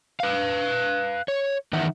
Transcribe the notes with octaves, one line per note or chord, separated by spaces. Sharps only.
B4 F5
C#5
D#3 E3 D#4 E5 F#5